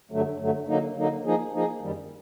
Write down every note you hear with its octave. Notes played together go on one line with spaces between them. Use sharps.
G2 D3 F#3 A3
G2 D3 F#3 A3
D3 F#3 A#3 D#4
D3 F#3 A#3 D#4
F3 A#3 D#4 G#4
F3 A#3 D#4 G#4
F#2 D#3 G3